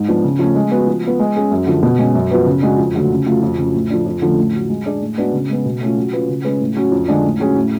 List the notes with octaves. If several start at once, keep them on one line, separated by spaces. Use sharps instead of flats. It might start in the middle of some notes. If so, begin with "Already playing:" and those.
Already playing: G#2
F3 B3 D4
C#3
F3 A3 C#4
G#3
B3 F#4
F3
B3 F4
G#3
C#4 G#4
F#2
D3 F3
B2
G#3 C#4
F#2
F3 B3 F#4 B4
C#3
G#3 D4 F#4
F2
D3 F#3 A3 F4
C#3
F#3 A3 F4
F2
C#3 F#3
A2
F3 A3 D4
F2
D3 F3 A3 C#4
A2
F#3 A3
G#3
D4 G#4 D5
A2
G#3 B3 D4 F#4
C#3
G#3 B3
B2
A3 C#4 F4
F#3
C#4 F4 B4
C#3
G#3 C#4 G#4 B4
A2
F#3 C#4 F#4
F2
D3 G#3 D4
A2
F#3 C#4 G#4
A2